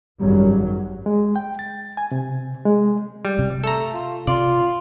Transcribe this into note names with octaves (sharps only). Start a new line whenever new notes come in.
G#1 F#2 F#3 G3
G#3
G5
A6
G#5
C3
G#3
G3
C3
A3 A4 A#5
F4
C3 F4 D5